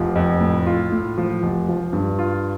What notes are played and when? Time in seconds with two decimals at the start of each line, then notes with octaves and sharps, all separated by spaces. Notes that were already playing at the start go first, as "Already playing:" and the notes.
Already playing: F1 F3
0.15 F2
0.41 A2
0.66 F4
0.92 A2
1.18 F3
1.43 F1
1.69 F3
1.93 G2
2.19 F4